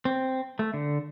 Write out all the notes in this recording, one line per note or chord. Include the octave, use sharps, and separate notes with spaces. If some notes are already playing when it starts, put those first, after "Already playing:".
C4
A3
D3